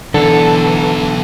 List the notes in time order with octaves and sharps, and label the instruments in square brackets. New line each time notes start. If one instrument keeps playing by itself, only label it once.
[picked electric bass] D3 [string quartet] E3 [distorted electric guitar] F#3 B3 [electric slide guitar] A4